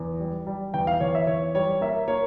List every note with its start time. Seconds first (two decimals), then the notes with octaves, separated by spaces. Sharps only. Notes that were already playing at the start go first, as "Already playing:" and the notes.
Already playing: E2
0.20 G3
0.47 G3
0.74 E2 G5
0.87 F5
1.00 E2 C#5
1.15 E5
1.27 E2 C#5
1.55 G3 C#5
1.81 A#3 E5
2.08 A#3 C#5